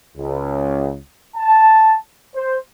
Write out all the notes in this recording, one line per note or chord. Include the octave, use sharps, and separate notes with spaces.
C#2
A5
C5